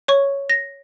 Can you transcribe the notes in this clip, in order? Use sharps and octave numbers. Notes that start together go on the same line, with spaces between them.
C#5 C#6
A#6